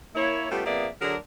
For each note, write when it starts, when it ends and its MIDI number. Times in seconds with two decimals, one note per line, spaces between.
0.15 0.48 58
0.15 0.48 64
0.15 0.48 73
0.50 0.61 55
0.50 0.61 57
0.50 0.61 59
0.50 0.61 61
0.50 0.61 65
0.50 0.61 67
0.66 0.87 41
0.66 0.87 58
0.66 0.87 59
0.66 0.87 68
0.66 0.87 74
0.66 0.87 76
1.01 1.16 50
1.01 1.16 54
1.01 1.16 62
1.01 1.16 68
1.01 1.16 70